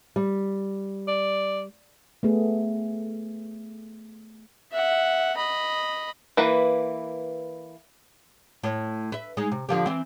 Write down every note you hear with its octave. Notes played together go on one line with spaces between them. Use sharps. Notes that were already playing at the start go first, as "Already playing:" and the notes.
G3
D5
A3 B3 G#4
E5 F#5
D#5 B5
E3 A#3 B4
A2
B4 E5
G#3 D#4
C3
D3 F3 G4
E3 C4